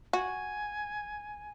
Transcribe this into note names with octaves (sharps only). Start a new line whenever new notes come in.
F#4 G#5